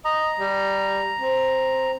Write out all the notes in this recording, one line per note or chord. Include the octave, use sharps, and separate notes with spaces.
D#5 A#5
G3
C4